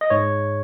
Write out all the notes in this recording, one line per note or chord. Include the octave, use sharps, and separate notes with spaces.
D#5
G#2 C#5